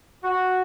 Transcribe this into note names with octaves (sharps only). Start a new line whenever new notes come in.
F#4